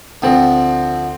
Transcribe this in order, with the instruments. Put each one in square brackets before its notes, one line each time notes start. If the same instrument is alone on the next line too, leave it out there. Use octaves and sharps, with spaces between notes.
[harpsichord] D2 D3 F3 [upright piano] C4